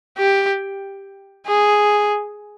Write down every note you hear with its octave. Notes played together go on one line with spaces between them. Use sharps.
G4
G#4